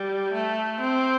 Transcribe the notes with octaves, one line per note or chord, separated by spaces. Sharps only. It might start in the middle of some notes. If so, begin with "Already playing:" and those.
Already playing: G3
A3
C4